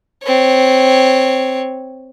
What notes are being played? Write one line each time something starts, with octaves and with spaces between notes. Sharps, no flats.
C4 C#5